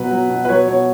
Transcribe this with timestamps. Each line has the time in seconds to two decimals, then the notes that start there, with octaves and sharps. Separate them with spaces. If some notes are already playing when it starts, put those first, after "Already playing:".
Already playing: B2 F#3 B4
0.11 F#3
0.30 B2
0.45 B4
0.49 F#3 C#5
0.68 B2 C#5